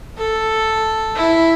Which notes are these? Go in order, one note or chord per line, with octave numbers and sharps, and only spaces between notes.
A4
E4